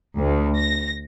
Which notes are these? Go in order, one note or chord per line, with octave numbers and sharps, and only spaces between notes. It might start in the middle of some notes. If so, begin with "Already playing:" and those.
D2
A#6